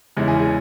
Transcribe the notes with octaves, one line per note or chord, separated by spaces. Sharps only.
E2 C#3 G#3 C#4 E4
G#4
G#4